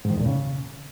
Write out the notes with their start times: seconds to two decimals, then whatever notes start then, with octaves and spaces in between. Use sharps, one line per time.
0.05 G#2
0.10 D#3
0.15 E2
0.21 A#2
0.26 C#3